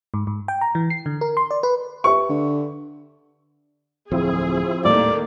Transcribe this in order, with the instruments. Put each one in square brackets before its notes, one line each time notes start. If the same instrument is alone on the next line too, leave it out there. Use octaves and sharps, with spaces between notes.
[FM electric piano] G#2
G#2
G5
A#5
E3
C7
D3
A#4
C6
D5
B4
[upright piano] G4 B4 E5 [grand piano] C#6
[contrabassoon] D3
[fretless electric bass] D1 F2 [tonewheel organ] F3 C4 E4 [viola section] G#4
[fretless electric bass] D#1 A2 G3 [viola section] D#3 A3 A#3 [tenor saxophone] D5